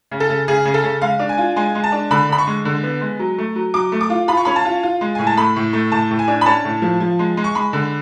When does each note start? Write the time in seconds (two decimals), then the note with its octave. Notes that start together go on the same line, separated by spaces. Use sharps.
0.11 C#3
0.20 A4
0.29 C#3
0.48 C#3 G#4
0.65 C#3
0.74 A4
0.84 C#3
1.02 G#3 F5
1.19 D4
1.29 G#5
1.38 F4
1.56 G#3 G#5
1.75 G#3
1.84 A5
1.92 D4
2.11 D3 B5
2.29 D3 B5
2.38 C#6
2.47 G#3
2.65 D3
2.83 B3
3.01 G#3
3.19 F#3
3.38 A3
3.56 F#3
3.74 F#3 D6
3.92 A3
4.01 D6
4.10 F4
4.28 F4 B5
4.37 C#6
4.45 C#4 B5
4.56 A5
4.65 F4
4.83 F4
5.01 G#3
5.15 A2 G#5
5.27 A5
5.37 A3 B5
5.56 A2
5.73 A3
5.92 A2 A5
6.11 A2
6.19 G#5
6.28 D4
6.41 B5
6.46 C#4 A5
6.64 A2
6.82 F3
7.00 F3
7.19 G#3
7.37 G#3
7.44 C#6
7.55 G#3 B5
7.73 D3